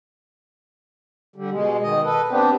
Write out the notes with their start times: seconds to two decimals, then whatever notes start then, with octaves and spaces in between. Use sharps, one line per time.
1.36 D3 G3
1.51 B2 G#3
1.83 B2 D#3 D#5
2.04 A4 B4
2.31 B3 C4 D4 G4